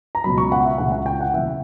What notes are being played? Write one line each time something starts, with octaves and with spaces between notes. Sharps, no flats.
A#5
C#2 B2 F#3 B5
C#6
F#5
E5
C#2 C#3 E3 F#5
F#5
G5
F#5
E2 C#3 E3 E5